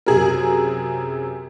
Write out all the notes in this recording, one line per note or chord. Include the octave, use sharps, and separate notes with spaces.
F#2 C3 G#4 A#4